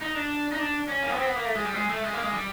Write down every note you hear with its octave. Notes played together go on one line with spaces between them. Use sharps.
D#4
D4
D#4
D4
C#4
A#3
B3
C4
B3
A#3
A3
G#3
G3
G#3
A3
G#3
A#3
G#3
G3